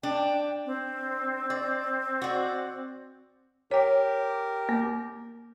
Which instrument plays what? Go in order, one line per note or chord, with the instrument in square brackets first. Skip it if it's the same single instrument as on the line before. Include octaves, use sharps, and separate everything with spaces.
[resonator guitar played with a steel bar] D4 [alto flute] G5
[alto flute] C4
[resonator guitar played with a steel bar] D5
F#4 D5
[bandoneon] G4 A#4 [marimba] C#5 G5
[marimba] A#3